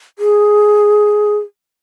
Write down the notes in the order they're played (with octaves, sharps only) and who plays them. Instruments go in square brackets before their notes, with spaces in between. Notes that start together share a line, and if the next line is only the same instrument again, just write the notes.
[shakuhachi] G#4